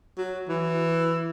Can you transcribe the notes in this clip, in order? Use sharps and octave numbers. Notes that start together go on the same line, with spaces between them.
F#3
E3